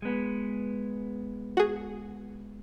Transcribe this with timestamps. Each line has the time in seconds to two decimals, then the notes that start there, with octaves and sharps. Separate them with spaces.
0.02 G#3 B3
1.57 F#4 G#4